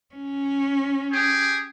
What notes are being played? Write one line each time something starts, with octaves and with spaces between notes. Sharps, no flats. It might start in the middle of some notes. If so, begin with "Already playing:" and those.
C#4
G4 G#4